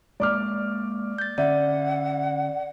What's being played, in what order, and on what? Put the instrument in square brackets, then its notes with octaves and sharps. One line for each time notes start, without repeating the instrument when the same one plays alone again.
[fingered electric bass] G#3 A#3 [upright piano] D5 D6 F6
[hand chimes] G6 A6
[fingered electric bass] D3 C#4 [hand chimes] D5 [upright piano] E5 [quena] F#5